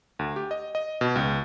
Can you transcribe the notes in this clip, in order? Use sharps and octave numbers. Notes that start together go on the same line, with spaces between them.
D2
G4
D#5
D#5
B2
C#2